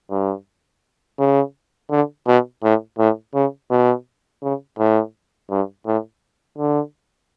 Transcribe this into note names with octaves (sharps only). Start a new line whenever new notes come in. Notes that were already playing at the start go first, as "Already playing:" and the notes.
G2
C#3
D3
B2
A2
A2
C#3
B2
C#3
A2
G2
A2
D3